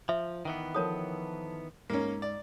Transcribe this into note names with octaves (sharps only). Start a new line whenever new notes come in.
F3 E5
D#3 E3 B3
F3 A4 A#4 C#5 D#6
G#2 A#3 C#4
D5